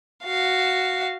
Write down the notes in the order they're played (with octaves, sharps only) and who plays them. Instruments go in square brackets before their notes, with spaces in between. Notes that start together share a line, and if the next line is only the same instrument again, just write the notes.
[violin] F#4 F5